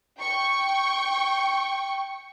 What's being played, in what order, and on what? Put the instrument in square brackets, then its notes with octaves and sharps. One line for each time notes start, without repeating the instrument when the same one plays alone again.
[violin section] G5 C#6